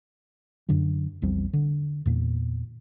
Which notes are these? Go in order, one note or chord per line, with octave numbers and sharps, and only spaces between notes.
F#2 D3 F#3
A#1 E2 G3 C4
D3
E2 A#2